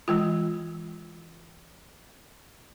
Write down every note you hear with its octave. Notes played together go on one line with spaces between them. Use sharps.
E3 G#3 F4